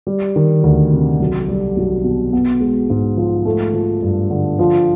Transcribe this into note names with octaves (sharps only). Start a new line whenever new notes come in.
G3
D#3
D2
C3
B1
G3
B1
B2
B3
G#3
G#2
F3
A3
F3
G2
D3
F3